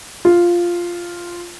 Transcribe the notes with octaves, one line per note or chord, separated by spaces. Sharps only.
F4